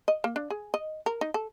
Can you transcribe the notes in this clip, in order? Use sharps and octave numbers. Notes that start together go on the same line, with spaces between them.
D#5
A#3
D4
G#4
D#5
A#4
D#4
A4